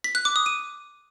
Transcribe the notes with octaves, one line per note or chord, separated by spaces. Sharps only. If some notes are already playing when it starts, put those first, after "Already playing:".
B6
F#6
D6
D#6
D#7